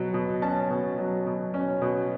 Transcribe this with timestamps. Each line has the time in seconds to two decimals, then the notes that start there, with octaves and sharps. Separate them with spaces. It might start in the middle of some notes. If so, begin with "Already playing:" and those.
Already playing: B2 F#3
0.14 B2
0.42 C#4 A5
0.70 B2
0.98 F#3
1.26 B2
1.54 C#4
1.81 B2